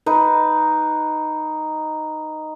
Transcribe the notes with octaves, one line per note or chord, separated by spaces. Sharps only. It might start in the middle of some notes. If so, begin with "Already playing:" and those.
D#4 B4